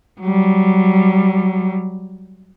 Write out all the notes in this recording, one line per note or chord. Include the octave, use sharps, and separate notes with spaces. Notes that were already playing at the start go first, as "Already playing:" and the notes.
F#3 G3